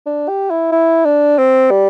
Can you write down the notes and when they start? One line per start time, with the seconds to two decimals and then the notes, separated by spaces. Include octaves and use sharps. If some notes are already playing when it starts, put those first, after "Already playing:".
0.06 D4
0.28 G4
0.50 E4
0.72 E4
1.05 D4
1.38 C4
1.71 G3